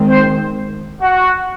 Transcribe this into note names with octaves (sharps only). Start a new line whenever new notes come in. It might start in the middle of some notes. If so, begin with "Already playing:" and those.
Already playing: D#3 G#3 C4
C5
F#4